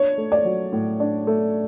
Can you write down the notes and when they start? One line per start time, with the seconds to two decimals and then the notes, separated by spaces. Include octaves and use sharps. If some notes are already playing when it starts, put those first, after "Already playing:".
Already playing: D4 C#5
0.18 A3
0.32 D5
0.45 F#3
0.73 A2
1.00 D4
1.27 A3